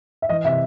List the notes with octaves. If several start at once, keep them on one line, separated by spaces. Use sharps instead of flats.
E5
E3 D#5
C3 E5